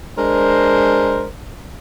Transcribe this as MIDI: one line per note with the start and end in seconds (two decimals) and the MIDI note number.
0.17 1.27 56
0.17 1.27 62
0.17 1.27 70
0.17 1.27 72